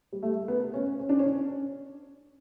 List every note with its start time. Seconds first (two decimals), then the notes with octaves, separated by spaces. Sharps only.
0.12 G3
0.23 A3
0.48 B3
0.74 C#4
0.99 C#4
1.09 D4
1.19 C#4